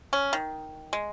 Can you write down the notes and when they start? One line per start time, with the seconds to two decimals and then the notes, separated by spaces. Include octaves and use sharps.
0.13 C#4
0.33 D#3
0.93 G#3